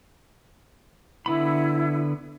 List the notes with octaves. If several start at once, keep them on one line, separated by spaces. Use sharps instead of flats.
D3 B3 E4 B5